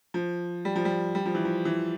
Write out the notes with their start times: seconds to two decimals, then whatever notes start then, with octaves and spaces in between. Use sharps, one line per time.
0.14 F3
0.65 G3
0.76 F3
0.85 G3
1.15 G3
1.26 F3
1.35 E3
1.45 F3
1.65 E3